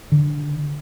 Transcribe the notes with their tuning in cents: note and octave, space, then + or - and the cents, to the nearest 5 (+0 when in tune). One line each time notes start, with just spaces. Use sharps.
D3 +0